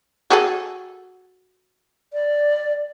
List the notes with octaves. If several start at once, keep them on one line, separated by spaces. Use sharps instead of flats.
F#4 G#4 A4
D5